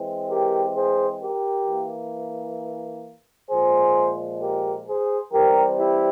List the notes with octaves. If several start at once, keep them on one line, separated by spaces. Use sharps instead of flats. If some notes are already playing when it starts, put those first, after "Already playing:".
Already playing: E3 G#3 C4
G4 A#4
G#4 C5
G4 A#4
E3 A#3
A#2 F3 G#3 G#4 C5
G4 A#4
G#4 C5
E3 G3 C4 G4 A#4
E4 G4